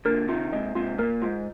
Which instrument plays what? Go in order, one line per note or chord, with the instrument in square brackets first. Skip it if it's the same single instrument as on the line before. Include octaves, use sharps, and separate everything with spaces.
[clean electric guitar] A#2 D3 [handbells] A#4
[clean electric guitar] C3 D#3 [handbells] F4
[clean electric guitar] G#2 C3 [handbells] D#5
[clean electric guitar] G#2 C3 [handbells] F4
[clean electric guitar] A#2 [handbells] A#4
[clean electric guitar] G#2 [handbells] F4